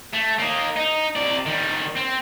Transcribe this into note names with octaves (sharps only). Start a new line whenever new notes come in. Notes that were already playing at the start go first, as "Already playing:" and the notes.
A3
A#3 D#4
D#4
C3 D5
D#3 G3
C4